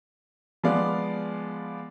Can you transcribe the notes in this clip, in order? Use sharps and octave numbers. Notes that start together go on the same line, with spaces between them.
F3 G#3 B3 D5 F5